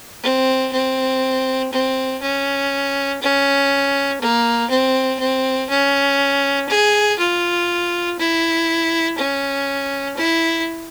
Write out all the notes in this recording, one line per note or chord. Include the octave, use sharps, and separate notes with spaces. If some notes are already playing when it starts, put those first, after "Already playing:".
C4
C4
C4
C#4
C#4
A#3
C4
C4
C#4
G#4
F4
E4
C#4
E4